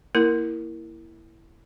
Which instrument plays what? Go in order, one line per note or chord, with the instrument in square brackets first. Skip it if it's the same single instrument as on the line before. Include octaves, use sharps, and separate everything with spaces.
[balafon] A#3 E4 A#4